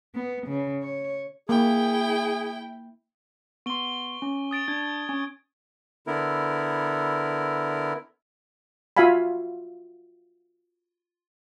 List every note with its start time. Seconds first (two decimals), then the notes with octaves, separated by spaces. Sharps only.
0.15 B3
0.47 C#3
0.82 C#5
1.49 A#3 E4 G#4 G5
3.66 B3 C6 C#6 D#7 G7
4.22 C#4
4.51 D#6 A6 D7
4.68 D4 G#6
5.09 C#4 G#5 C#6
6.07 D3 B3 E4 A#4
8.97 F4 F#4 E5 F5 G#5 B5